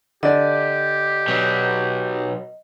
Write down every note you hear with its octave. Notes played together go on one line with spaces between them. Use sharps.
D3 G4 D5 D#5
B2 F#3